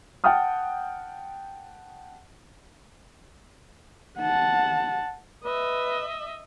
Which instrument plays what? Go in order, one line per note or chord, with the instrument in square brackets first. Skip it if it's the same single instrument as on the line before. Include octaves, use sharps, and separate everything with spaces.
[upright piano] F#5 G5 A5 D#6 F6
[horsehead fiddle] F#5 A5
[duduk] B4 [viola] D#5 E5